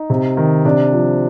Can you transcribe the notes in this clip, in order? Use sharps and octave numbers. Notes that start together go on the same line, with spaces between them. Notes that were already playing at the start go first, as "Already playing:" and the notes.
Already playing: D#4
C3
D#3
C3 D4
F3